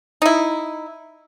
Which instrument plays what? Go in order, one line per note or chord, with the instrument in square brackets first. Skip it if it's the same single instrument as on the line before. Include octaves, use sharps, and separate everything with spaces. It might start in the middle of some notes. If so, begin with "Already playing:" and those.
[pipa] D#4 E4